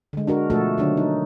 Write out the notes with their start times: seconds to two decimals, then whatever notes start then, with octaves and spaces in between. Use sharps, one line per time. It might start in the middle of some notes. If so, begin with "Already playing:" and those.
0.13 D3 G#3
0.27 D4 F#4 A#4
0.50 B2 F3 A3 F#4 A4
0.78 D3 D#3 F#3 D4
0.97 D#4